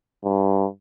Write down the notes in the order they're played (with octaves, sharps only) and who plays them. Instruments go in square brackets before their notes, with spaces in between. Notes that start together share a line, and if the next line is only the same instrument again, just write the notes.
[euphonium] G2